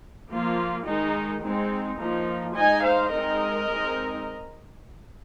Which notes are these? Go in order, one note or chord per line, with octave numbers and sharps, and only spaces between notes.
F3 A#3 F4
D#3 G#3 D#4
G#3 C4 D#4
F3 A#3 D#4
G#3 D#4 D#5 G#5
C5 F5
G#3 C4 D#4 A#4 D#5
G#3 C4 D#4